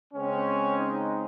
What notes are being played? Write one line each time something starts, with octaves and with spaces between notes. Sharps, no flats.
C#3 G#3 C4 C#4
D#4